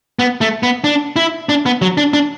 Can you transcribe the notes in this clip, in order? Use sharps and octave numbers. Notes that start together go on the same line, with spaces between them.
B3
A3
B3
D4
E4
D4
B3
F#3
D4
D4